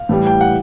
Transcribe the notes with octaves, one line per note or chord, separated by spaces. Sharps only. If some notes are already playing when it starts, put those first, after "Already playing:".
Already playing: F5
A2 E3 G3
G5
F#5